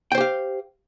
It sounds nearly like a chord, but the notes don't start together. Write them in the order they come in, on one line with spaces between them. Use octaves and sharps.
G5 C5 G4 F5